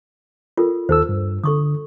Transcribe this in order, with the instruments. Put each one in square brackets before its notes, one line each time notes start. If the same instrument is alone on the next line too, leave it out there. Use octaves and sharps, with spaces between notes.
[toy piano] F4 A4 A#4
[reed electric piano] D#2 A4 E6 [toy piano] C5
[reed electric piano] G2
[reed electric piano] D3 [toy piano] A4 C#6 D#6